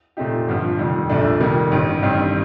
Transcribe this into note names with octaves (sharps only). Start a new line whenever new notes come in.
A#2 A3 C4 D#4 G4
G1 G2 F3
F1 F2 D#3 G3
A#1 A#2 A3 D4 A4
F1 F2 D#3 G3 A#3
A1 G2 D#3
A1 G2 D#3 G3 C4